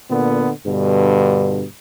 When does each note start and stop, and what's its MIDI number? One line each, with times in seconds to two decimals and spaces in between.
0.10 0.50 46
0.10 0.50 50
0.10 0.50 59
0.66 1.65 43
0.66 1.65 47
0.66 1.65 50